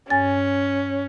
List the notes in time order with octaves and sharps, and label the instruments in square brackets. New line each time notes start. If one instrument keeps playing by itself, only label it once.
[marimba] G2 G#5 A6 [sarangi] C#4